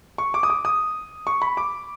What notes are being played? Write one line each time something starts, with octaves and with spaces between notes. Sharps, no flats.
C#6
D6
D#6
D6
D#6
C#6
B5
D6